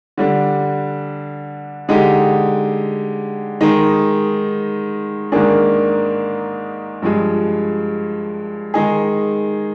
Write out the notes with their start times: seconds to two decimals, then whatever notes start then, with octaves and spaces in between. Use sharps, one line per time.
0.18 D3 G3 D4
1.89 D3 G#3 D#4 G4
3.61 D#3 G#3 D#4
5.32 G#2 D#3 A#3 D4 G#4
7.02 G2 F3 G#3
8.74 D#3 G#3 D#4 G#4